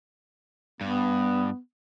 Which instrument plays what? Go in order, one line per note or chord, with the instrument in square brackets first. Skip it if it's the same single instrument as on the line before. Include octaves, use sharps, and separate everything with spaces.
[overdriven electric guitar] G2 [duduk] B3